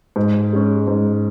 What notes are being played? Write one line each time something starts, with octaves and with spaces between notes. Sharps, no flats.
G#2
G#3 C#4
G#2